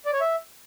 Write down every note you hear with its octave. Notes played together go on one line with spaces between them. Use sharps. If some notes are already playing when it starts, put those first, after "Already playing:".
D5
C#5
E5